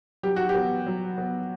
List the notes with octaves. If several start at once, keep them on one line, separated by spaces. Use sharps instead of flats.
F#3 G4
F#4
G4
B3
F#3
B3